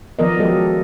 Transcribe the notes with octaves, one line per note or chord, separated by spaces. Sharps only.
D#3 F3 B3 A#4 D5 D#5
F#3 G#3 G4 A4 D#5